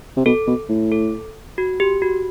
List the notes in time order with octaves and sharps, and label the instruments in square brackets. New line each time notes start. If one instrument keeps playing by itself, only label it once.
[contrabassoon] C3
[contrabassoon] B2 [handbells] A4
[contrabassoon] B2
A2
[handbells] A4
F#4
G4
F#4